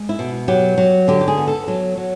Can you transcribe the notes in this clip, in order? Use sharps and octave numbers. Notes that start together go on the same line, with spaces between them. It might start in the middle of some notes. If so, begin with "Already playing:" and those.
Already playing: G#3
E4
B2
F#3 G4
F#3
D3 G4
G4
G#4
B3
A4
F#3 A4
F#3